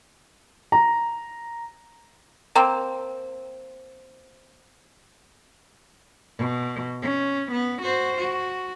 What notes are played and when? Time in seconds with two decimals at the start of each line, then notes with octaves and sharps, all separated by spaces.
0.72 A#5
2.55 A#3 C4
6.38 B2
7.02 C#4
7.51 B3
7.82 F#4 C5
8.18 F#4